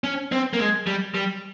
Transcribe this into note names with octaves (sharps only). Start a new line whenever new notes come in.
C#4
C4
A#3
G#3
G3
G3